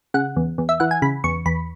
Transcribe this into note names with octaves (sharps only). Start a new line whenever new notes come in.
C#3 F#5
E2
E2
E5
E3 F#5
G#5
C#3 B5
E2 C#6
E2 B5